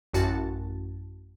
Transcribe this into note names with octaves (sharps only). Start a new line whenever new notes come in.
A1 F#2 F#4 A5 A6